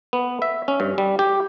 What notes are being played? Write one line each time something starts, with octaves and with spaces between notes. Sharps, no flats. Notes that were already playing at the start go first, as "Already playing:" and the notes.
B3
E5
C#4
G2
G3
G4